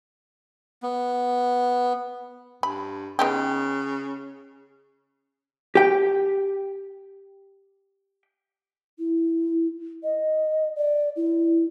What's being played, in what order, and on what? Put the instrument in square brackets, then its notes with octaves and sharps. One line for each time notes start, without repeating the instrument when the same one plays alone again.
[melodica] B3
[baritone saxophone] G2 [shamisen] B5
[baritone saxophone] C#3 [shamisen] B3 D#4 G4
[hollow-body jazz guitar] G4 G5
[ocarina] E4
D#5
D5
E4